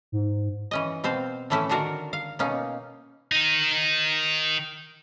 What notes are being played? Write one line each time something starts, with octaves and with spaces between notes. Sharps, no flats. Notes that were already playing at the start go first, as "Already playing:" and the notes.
G#2
E3 C#4 D#5
B2 C4 C5 F5
A2 E3 A3 C#4 E4
D3 D#3 D4 F#4 A#4 D5
F5
B2 A#3 C#4 D#4
D#3 D#4